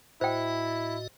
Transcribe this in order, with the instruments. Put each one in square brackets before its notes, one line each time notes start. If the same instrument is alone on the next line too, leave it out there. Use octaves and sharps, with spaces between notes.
[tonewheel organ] A2 F#4 D#5 [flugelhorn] E4 [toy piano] C5 G5